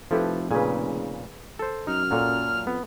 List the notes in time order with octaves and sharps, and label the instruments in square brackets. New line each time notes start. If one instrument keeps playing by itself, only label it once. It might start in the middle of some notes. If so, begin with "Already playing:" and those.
[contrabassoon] F1 [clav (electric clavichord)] F3 E4 G4 [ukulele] A4 B4
[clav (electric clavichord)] A#2 C#3 [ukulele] G#4 B4
[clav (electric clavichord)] A4 C5
[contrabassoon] F#2 [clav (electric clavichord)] D#4 [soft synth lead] F6
[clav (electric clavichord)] A#2 F#3 [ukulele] A4
[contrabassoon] F2 [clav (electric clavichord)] B3